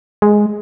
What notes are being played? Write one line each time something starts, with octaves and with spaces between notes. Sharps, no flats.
G#3